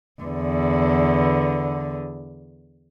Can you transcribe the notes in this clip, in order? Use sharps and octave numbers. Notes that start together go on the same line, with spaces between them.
E2 D3